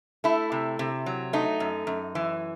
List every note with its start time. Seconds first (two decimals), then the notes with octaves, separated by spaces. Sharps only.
0.24 A3 E4
0.52 C3
0.79 C3
1.06 F#3
1.33 A3 D#4
1.60 F#2
1.87 F#2
2.15 E3